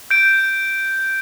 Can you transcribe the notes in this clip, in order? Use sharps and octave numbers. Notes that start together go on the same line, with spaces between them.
G6 D7